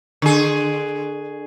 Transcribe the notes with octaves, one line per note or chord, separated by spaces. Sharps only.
D3 G#4